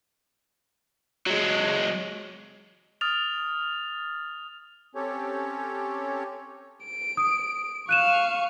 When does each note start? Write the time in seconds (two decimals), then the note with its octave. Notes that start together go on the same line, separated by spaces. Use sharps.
1.26 F#3 G#3
3.01 D#6 F6 A6 F7
4.95 C4 C#4 G4 A4 C#5
6.85 D7
7.17 D#6
7.89 F5 C#6 F#6 D#7 E7